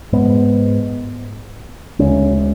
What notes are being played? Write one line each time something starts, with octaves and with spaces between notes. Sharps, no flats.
G#2 G#3 B3
D2 C#3 G#3 C#4